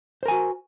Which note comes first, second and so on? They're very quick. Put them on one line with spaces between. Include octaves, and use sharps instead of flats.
C5 A#4 G#5 F#4